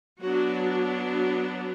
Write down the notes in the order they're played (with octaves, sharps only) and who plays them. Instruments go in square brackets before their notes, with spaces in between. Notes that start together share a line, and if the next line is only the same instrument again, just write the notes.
[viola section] F#3 B3 D4 F#4